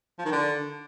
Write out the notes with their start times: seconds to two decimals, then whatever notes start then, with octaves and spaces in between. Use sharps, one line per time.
0.19 F3
0.25 D#3
0.32 D3